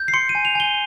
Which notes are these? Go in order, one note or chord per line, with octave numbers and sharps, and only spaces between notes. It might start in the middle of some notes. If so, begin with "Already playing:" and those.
Already playing: G6
C7
C6 C#7
D#7
G#5
F7
G#5 G7